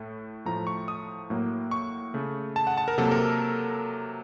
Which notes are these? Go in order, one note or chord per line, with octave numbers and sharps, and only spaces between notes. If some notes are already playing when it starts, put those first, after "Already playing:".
Already playing: A2 A3
A2 F3 A3 A#5
C#6
D#6
A2 F#3 A#3
C#6
C#3 A3
A5
F#5
A5
A#4
C3 F#3 A#3 A4
A#4